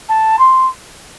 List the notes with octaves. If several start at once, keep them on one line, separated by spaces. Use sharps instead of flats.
A5
C6